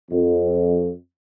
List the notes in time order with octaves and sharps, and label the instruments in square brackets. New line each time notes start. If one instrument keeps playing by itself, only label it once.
[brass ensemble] F2